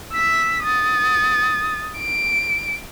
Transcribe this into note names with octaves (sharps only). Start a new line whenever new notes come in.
E6 B6
D#6 A6
D7